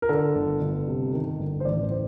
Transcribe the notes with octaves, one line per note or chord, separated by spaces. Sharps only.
A#4
D3 A4
G1
G1
C3
D#3
G1
C5
A1 D5
A2 C5